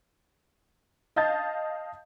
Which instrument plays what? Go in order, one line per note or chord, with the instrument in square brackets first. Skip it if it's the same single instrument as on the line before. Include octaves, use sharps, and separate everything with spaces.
[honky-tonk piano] D#5 F5 A5 G6 A6